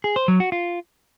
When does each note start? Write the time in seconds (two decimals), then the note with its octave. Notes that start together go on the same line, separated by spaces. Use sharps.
0.04 G#4
0.16 C5
0.28 F#3
0.40 F#4
0.52 F4